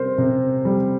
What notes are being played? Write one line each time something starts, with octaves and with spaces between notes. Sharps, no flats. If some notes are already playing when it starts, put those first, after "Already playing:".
Already playing: C3 G3 A#4 C5
C3
G3